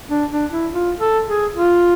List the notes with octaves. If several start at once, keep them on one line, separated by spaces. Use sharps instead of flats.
D4
D4
E4
F4
A4
G#4
F4